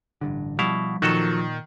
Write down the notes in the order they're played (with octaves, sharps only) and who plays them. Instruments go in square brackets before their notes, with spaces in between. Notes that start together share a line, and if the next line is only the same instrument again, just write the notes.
[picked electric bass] A1 G2 D3
[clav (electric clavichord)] B2 E4 F5 [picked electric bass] F3 G3
[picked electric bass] A#2 [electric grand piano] D#3 [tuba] F3 [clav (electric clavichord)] F#3 F#4 A4